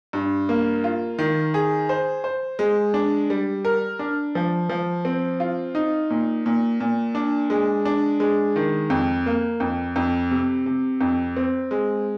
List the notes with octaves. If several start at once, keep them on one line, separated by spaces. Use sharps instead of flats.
G2
A#3
F4
D#3
G#4
C5
C5
G#3
D4
G3
A#4
D4
F3
F3
C4
F4
D#4
A#2
A#2
A#2
D4
G#3
D4
G#3
D#3
F2
A#3
F2
F2
C3
C3
F2
C4
G#3